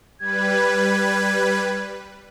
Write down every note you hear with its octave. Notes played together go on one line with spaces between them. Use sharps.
G3 B4 G#6